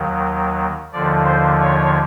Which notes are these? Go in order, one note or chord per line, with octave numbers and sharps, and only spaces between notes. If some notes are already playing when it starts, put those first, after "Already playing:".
Already playing: D#2 D#3 F#3
D#2 D3 F3 D5
C5
C#5